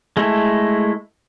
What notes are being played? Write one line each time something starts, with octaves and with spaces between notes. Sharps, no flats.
G#3 A3 E4 A4